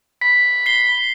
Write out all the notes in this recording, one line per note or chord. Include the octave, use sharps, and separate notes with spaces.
B5 B6
C7 G7